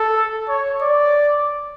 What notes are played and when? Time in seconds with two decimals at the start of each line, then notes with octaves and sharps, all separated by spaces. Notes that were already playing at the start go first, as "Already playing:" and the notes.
Already playing: A4
0.48 C#5
0.82 D5